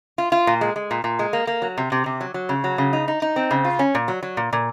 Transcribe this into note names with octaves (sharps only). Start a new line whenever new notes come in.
F4
F4
A#2
G#3
G#3
A#2
A#2
G#3
A#3
A#3
F#3
C3
C3
C3
F#3
F#3
C#3
F#3
C#3
D#4
D#4
D#4
C4
C#3
F4
C#4
A#2
F#3
F#3
A#2
A#2